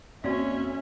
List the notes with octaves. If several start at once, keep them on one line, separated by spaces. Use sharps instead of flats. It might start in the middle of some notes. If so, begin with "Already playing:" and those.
E2 A#3 C4 C#4 F#4 D5 E5 F5